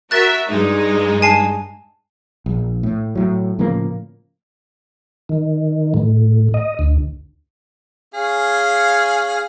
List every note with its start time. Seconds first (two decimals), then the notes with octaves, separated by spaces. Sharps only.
0.11 F#4 A#4 E5 F#6 A6
0.48 G2 G#3 D#4
1.22 G#5 A5 C7
2.46 A#1
2.83 A2
3.15 A2 F#3
3.59 A2 C#3 F3 A#3
5.29 D#3
5.94 A2
6.54 D#5
6.79 D2
8.14 C#4 G#4 F5